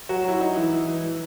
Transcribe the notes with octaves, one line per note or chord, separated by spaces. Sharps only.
F#3 F#4
F#3 E4
F#4
D#4
E3 E4
E4
E3
E3